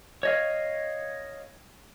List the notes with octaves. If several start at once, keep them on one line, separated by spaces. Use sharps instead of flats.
C#5 D#5 F5